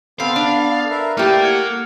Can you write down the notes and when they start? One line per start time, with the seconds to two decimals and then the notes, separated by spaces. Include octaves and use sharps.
0.20 B3 C4 A4 F5 B5 C7
0.36 D4
0.90 A#4 B4 E5
1.17 A3 A#3 E4 G4 D5 F6
1.42 F#5 F6 G#6 C#7